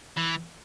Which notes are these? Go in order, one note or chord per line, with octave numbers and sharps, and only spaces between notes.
E3